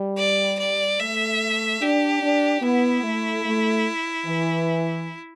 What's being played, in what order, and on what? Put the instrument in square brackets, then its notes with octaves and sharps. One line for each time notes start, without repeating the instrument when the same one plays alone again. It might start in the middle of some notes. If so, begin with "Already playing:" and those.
Already playing: [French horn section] G3
[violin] D5
D5
[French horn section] A3 [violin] E5
[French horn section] D4 [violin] G4
[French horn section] D4
[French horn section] B3 [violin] E4
[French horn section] A3
A3
E3